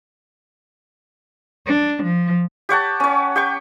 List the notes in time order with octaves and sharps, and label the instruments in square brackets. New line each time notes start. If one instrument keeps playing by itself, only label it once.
[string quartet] D4
F3
[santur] G4 C#5 F#5 A5
C#4 C#5
G4 G5 C#6